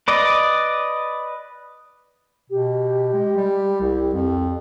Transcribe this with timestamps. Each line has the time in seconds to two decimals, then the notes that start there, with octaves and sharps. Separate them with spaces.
0.08 B4 D5 D#5
2.50 B2 G4
3.13 G#3
3.37 G3
3.81 C2
4.14 F2